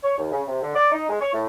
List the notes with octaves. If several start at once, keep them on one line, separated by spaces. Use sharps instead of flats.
C#5
D#2
C#3
C3
D3
D5
D#4
G#3
C#5
A2